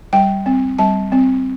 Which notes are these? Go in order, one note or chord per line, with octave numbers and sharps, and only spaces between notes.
G3 G5
C4
G3 A5
C4